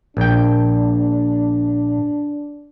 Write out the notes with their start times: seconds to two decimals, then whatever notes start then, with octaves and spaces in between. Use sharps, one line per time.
0.17 A#1 D4 G5